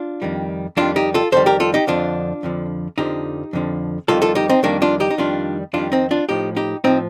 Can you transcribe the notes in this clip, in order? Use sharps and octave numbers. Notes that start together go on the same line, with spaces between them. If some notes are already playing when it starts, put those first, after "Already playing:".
Already playing: D4 F4
F2 D#3 G3
F2 D#3 G3 D4 F4
D#4 G4
F4 A4
F2 D#3 G3 A4 C5
G4 A#4
F4 A4
D#4 G4
F2 D3 F3 D4 F4
F2 D3 F3
F2 D3 F3 D#4 G4
F2 D3 F3
F2 D#3 G3 F4 A4
F4 A4
D#4 G4
C4 D#4
F2 D#3 G3 A#3 D4
D4 F4
D#4 G4
D#4
F2 D#3 G3 D4 F4
F2 D#3 G3 D4 F4
C4 D#4
D4 F4
A2 F3 D#4 G4
D#4 G4
A2 F3 C4 D#4